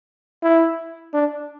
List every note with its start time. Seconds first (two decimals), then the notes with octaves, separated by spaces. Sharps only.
0.43 E4
1.14 D4